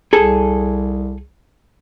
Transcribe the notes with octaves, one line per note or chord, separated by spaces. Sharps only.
C2 G#4 A4